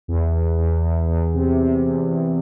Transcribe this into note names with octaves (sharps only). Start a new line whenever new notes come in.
E2
E2
E2
E2
E2
C3
C3
E2
E2